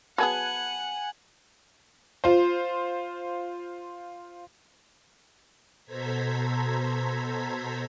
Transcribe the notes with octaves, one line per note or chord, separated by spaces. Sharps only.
F#3 B3 G#4 B4 F#5 G#5 A5
F4 C5
B2 A4 C5 A#5 G#6 B6